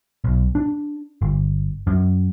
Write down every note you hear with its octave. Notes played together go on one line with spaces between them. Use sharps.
B1
D4
G1
F#2